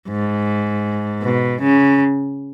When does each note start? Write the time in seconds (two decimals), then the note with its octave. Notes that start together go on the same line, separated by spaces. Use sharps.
0.09 G#2
1.22 B2
1.61 C#3